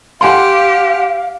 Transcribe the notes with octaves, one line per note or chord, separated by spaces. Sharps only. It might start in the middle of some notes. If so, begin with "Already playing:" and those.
G4 F5 F#5 G#5 C6